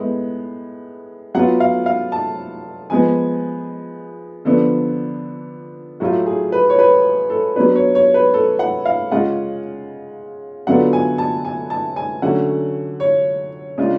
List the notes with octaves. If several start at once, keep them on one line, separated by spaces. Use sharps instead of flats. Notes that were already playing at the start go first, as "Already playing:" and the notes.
Already playing: A2 G#3 B3
F#3 B3 F4 F#5
F5
F5
A5
F3 G#3 B3 G#5
D3 F3 B3 D4 A4
A2 F#3 A3 F4 F#4
G#4
B4
C#5
B4
A4
F#3 B3 D4 B4
C#5
C#5
B4
A4
F#5
F5
C#3 G#3 C#4 F4 F#5
D3 F#3 B3 D4 F4 F#5
G#5
A5
G#5
A5
G#5
D3 F#3 A3 C#4 F#5
C#5
C#3 G#3 D4 F4